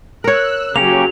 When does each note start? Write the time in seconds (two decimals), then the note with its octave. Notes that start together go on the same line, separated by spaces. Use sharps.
0.24 A#4 C#5 E6 F#6
0.76 C#3 F#3 A#3 C#4 G4 F7